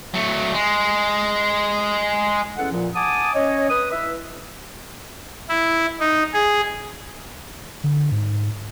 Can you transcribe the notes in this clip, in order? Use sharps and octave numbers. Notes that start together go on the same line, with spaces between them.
F#3 A3
G#3
E2 C#4 A4 F#5
A#2 F3
F#5 G#5 A5 D6 D#6
C#4 C#5 D#5
B4 D#6
E4 B4 E5
E4
D#4
G#4
D3
G#2